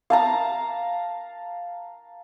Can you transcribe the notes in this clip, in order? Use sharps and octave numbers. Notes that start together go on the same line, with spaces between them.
F5 A5 A#5